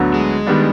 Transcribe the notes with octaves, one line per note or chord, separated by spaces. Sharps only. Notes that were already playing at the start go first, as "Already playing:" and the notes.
Already playing: D2 D3 F#3 B3
G#3
D#3 G3 B3 D4